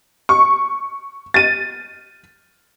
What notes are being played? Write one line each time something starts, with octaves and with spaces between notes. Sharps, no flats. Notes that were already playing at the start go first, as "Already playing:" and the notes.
C#6
A6 D#7